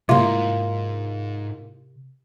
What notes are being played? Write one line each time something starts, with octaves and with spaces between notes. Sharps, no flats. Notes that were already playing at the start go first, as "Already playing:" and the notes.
C2 G#2 C3 A#3 F4